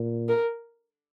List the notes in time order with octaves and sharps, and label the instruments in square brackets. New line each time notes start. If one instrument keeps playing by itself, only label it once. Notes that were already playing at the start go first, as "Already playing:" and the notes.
Already playing: [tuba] A#2
[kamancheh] A#4